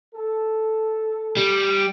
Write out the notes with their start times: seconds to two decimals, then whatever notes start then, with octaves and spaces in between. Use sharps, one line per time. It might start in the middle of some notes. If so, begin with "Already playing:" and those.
0.14 A4
1.37 G3